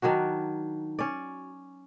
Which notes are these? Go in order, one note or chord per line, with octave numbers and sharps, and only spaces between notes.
D#3 F#3 D4 F#4
C#4 D5